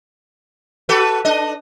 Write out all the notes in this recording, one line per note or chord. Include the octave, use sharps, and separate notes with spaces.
F#4 A4 B4
D4 D#5